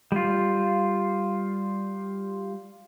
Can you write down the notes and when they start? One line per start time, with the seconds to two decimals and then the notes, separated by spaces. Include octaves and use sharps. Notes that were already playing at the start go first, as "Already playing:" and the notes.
0.12 G3 F4